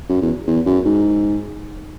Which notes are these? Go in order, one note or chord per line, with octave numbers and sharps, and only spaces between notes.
F#2
E2
E2
F#2
G#2